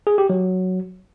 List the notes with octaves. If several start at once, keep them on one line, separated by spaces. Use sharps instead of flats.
G#4
G4
F#3